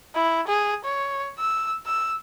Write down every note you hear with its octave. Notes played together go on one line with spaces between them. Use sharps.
E4
G#4
C#5
E6
E6